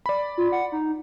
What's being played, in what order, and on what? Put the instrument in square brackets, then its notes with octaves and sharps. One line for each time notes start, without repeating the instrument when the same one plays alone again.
[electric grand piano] D5 B5
[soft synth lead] F4
F#5
D#4